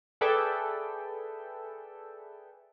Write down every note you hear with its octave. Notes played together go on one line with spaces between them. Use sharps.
G#4 A4 B4 D5 E5 G5